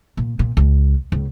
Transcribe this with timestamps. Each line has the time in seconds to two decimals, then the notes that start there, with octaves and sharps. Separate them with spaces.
0.17 A#2
0.39 A#2
0.57 C#2
1.12 C#2